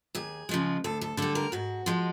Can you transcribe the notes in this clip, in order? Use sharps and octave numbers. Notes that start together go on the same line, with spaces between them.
D#2 G#4
C#3 F3 G#3
D2 A4
A4
D3 G3 A4
A#4
G#2 F#4
F3 G#3